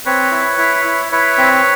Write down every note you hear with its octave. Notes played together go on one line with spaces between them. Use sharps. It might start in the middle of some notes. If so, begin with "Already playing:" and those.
C4 B4 C#5
E4
E4
E4
E4 B4 C#5
C4